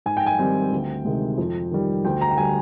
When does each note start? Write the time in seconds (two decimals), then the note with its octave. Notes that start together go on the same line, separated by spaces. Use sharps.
0.06 G#2 G#5
0.17 G5
0.26 G#5
0.39 D#3 G3 C4 G5
0.72 D2
1.05 C3 D#3 G#3
1.38 F2
1.71 D#3 G3
2.05 D2 G5
2.21 A#5
2.31 G5
2.38 D3 G3 G#5